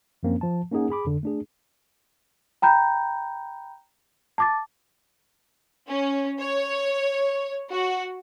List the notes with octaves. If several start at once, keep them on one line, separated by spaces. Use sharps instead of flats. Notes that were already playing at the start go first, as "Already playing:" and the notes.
F#2 F3 A#3 C4 C#4
F3 A5
A#3 C#4 D#4 G#4 F#5
G#4 B5 D6
F2 D3
A3 D4 G#4
G5 A#5 B5 G6
A5 D6 A6
C#4
C#5
F#4